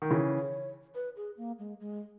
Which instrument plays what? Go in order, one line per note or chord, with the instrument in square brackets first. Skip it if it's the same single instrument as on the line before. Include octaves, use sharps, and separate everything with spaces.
[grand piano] D#3
[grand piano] C#3 E3 [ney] C#5
[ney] B4
G#4
A#3
G#3
G#3